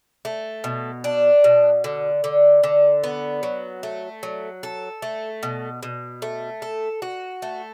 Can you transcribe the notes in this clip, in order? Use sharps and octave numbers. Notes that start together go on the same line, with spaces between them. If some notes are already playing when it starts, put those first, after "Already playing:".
A3
B2
D4
B2
D3
D3
D3
B3
F#3
A3
F#3
A4
A3
B2
B2
A3
A4
F#4
A3